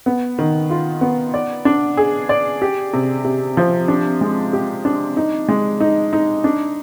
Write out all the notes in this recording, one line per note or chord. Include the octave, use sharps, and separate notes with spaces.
B3
D#3
F4
B3
D5
D4
G#4
D5
G4
C3
C3
F3
D4
G#3
G4
D4
D#4
G#3
D#4
D#4
D4